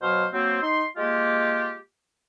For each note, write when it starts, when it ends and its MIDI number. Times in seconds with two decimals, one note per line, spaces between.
0.02 0.25 47
0.02 0.25 54
0.02 0.25 72
0.02 0.25 77
0.33 0.60 54
0.33 0.60 58
0.33 0.60 60
0.62 0.84 63
0.62 0.84 84
0.97 1.75 56
0.97 1.75 58
0.97 1.75 65
0.97 1.75 67